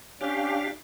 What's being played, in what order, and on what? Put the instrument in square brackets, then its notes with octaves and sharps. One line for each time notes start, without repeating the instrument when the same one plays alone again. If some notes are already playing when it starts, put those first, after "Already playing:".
[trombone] C#4 [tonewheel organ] D4 G4 F5